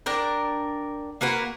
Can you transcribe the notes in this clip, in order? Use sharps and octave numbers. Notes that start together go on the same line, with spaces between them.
D4 A#4 G5
A#3 F#4 A#4 B4